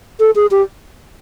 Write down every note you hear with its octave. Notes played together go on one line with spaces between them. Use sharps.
A4
G#4
G4